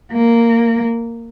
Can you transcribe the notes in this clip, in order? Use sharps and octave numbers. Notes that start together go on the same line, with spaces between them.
A#3